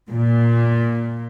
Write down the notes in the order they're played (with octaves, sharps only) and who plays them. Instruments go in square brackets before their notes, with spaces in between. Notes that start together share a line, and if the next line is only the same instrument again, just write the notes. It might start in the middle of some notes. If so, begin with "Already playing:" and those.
[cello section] A#2